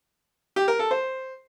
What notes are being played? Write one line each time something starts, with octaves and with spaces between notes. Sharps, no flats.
G4
A#4
A4
C5